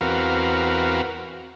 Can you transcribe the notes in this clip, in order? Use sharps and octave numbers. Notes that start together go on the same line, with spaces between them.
E2 C4 F#4 A#4 B4 F5